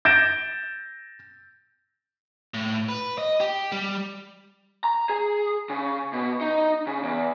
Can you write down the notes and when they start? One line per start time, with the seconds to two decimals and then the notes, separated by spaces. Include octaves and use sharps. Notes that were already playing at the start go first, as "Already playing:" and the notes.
0.05 G6 A6 A#6 D7 E7
2.54 A2
2.89 B4
3.18 D#5
3.40 G4
3.72 G3
4.84 A#5
5.09 G#4
5.70 C#3
6.13 B2
6.41 D#4
6.87 C#3
7.03 E2